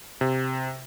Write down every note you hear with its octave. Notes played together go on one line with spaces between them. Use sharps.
C3